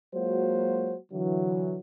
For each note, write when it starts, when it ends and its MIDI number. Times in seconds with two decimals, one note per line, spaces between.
0.15 0.97 54
0.15 0.97 56
0.15 0.97 58
0.15 0.97 65
0.15 0.97 66
0.15 0.97 72
1.12 1.80 50
1.12 1.80 52
1.12 1.80 54